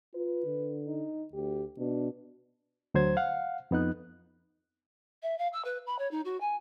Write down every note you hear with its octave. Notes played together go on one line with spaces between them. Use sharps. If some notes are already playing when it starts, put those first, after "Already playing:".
F4 B4
D3
D#4
D2 G4
B2 D4
D2 F#3 C5 G#6
F5 F#5
F2 B3 D#4 F#6
E5
F5
E6
B4
B5
C#5
D#4
F#4
G#5